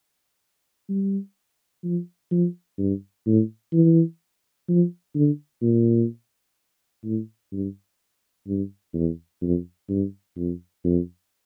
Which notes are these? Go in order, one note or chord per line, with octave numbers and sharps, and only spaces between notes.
G3
F3
F3
G2
A2
E3
F3
D3
A#2
A2
G2
G2
E2
F2
G2
F2
F2